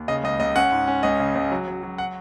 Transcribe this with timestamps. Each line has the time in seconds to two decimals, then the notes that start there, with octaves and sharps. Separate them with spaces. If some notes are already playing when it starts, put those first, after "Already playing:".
Already playing: D#2
0.08 C#3 D#5
0.23 C#2 D#5
0.40 C#2 D#5
0.56 C#4 F#5
0.71 G#2
0.87 C#4
1.03 C#2 D#5
1.20 C#3
1.35 C#2
1.51 F#3
1.68 F#3
1.83 F#3
1.98 F#5